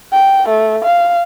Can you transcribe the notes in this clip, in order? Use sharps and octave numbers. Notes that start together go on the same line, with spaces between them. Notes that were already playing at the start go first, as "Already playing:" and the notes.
G5
A3
F5